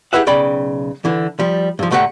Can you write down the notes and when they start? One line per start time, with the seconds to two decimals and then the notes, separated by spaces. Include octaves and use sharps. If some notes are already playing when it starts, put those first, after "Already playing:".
0.13 E4 G4 G#4 B4 E5 F#5
0.27 B1 C#3 D5 G5 B5
1.05 D3 E3
1.39 F3 G3
1.79 G2 F3
1.91 A2 D3 A3 G4 F#5 A#5